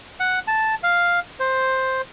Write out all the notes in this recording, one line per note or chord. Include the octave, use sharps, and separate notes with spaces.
F#5
A5
F5
C5